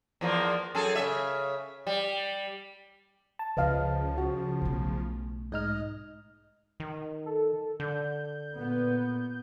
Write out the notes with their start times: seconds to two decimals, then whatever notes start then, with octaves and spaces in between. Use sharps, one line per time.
0.21 E2 F3 A#3
0.75 F#2 G#4 A4
0.96 C#3 E5
1.87 G3
3.39 A5
3.57 C#2 C#3 F3 B4 D#5 F5
4.18 F#4
4.61 B1 A3
5.52 G#2 D#4 D#5 F6
6.80 D#3
7.26 A4
7.80 D3 G6
8.53 A#2 B3